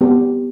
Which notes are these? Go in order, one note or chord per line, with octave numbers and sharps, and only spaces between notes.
B3 G4